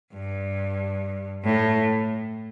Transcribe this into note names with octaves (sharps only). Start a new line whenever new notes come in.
G2
A2